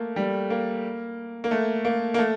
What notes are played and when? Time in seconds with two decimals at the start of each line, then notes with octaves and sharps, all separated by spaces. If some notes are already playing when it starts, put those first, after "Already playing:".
Already playing: A3 A#3
0.16 G3
0.50 A#3
1.44 A#3
1.51 A3
1.85 A#3
2.14 A#3
2.18 A3